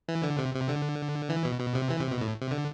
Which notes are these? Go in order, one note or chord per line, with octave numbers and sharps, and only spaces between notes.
E3
D3
C3
C3
D3
E3
B2
B2
C3
E3
C3
B2
A2
C3
D3